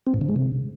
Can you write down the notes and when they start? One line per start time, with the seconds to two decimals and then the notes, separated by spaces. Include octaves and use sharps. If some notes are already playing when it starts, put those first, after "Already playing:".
0.07 C4
0.14 A2
0.21 D3
0.29 G#3
0.36 C3